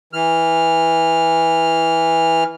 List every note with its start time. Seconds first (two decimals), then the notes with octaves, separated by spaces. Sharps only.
0.13 E3 F6